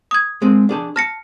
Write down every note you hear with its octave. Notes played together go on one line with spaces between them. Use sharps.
D#6 G#6
G#3 C4 G#4
D4 G#4 A5
A5 F6 A#6 C#7